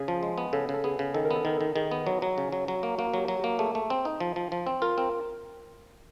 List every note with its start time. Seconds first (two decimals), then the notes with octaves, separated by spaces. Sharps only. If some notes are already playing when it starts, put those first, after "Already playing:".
Already playing: C#3 G#4
0.08 F3
0.23 G#3
0.38 B3
0.53 C#3 A4
0.69 C#3 A4
0.84 B3 G#4
0.99 C#3
1.14 D#3 A4
1.25 A#4
1.31 B3
1.36 A4
1.45 D#3 A#4
1.58 D#3 A4
1.75 D#3 G#4
1.91 B3
2.07 F#3
2.22 F#3
2.38 C#3
2.52 F#3
2.68 F#3
2.83 A#3
2.98 A#3 F#4
3.14 F#3 G4
3.28 F#3
3.40 A#3 G4
3.59 A3 G#4
3.75 A3
3.90 C4
4.05 D#4
4.20 F3
4.36 F3
4.52 F3
4.67 C4
4.82 F4 A#4
4.97 C4 A#4